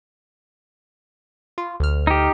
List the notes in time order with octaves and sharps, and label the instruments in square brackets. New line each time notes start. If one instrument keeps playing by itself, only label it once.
[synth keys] F4
D2 F6
[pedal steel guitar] D#4 G4